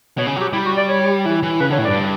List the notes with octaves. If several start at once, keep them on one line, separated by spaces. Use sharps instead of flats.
B2 C#5
C#3
F#3
G4
G3 E4
F#4
D5
C#5
E3
E3
C#3 B4
D3 C#5
A2
G2 D5